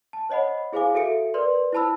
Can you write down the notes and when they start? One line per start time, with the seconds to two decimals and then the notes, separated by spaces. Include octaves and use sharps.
0.13 A5
0.29 C5 C#5 D#5 F#5 B5
0.73 E4 G#4 C5 F5 G#5 D6
0.95 F#4 A4 E5 C#7 D7
1.34 A#4 B4 D5 C6
1.72 E4 C5 A5 B5 E6